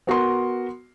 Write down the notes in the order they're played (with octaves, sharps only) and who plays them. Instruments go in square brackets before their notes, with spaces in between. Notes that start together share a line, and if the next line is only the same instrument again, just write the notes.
[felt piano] B3 F#4 A#4 C6